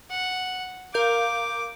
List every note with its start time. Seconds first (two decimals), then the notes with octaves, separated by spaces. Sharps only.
0.11 F#5
0.94 A#4 F5 D6 G6